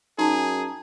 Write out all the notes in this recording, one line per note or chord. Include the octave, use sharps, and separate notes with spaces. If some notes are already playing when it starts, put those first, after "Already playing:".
F#2 D#4 G#4 A5 A#5